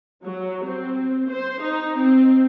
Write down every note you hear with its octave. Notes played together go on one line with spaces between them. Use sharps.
F#3
C4
C5
D#4
C4